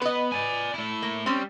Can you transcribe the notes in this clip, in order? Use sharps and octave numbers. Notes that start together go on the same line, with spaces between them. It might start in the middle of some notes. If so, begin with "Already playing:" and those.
B3 B4 D#5
D5 G#5
A3 E4
A#3
G3 C4 C#4